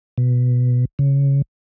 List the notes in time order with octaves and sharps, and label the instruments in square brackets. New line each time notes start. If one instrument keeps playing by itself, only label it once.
[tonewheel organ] B2
C#3